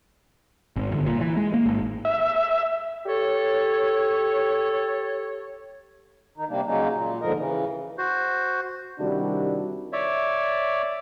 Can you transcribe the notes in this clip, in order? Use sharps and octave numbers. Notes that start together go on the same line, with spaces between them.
G#1
G1
A#2
E3
G#3
A#3
G#1
E5
G4 A4 C#5
D#3 D#4
C3 G3 A#3 D4
C#3 F#3 G#3 A#3 C#4 D#4
A#2
D#2 G#2 D3 F3 A#4 D#5
C#3 E3
F#4 C5
C3 D#3 G3 D4 E4 F#4
C#5 D5 E5